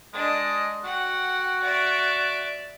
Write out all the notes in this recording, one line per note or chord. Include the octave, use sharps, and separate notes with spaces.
G#3 D4 D#5
F#4 F#5 G5
D5 E5